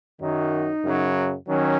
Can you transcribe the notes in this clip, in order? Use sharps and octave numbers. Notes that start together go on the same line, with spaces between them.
F#2 D#3 F#3 D#4
F#2 C#3 F#3
D#3 F#3 C#4